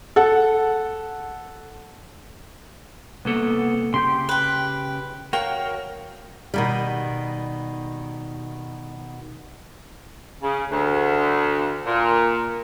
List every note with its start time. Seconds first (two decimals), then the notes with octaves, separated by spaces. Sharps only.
0.16 A4 F#5
3.25 C2 A#3 B3 A4
3.94 C#3 G4 C6 G6
4.29 B4 G5
5.33 F#4 A#4 C#5 F5 G5 C#6
6.54 B2 D#3 G3
10.42 C#3
10.71 D2
11.86 A#2